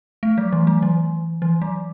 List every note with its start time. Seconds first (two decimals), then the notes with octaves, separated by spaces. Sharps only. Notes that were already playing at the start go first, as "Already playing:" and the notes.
0.23 A3
0.38 F#3
0.53 E3
0.67 F#3
0.83 E3
1.42 E3
1.62 F#3